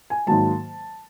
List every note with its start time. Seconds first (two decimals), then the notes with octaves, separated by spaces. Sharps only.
0.10 G#5
0.27 G#2 D#3 F#3 A#3 A5